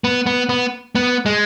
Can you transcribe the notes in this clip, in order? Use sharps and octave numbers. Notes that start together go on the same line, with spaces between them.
B3
B3
B3
B3
G#3